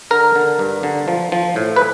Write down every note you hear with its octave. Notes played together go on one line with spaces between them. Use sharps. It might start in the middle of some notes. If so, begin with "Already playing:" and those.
D3 A#4
D3
G2
D3
F3
F3
A2
B4